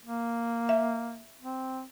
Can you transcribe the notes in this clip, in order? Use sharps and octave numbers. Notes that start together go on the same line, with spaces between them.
A#3
E5
C4